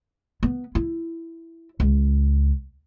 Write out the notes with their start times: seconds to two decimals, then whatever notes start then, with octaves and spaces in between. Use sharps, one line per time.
0.43 B3
0.75 E4
1.80 C#2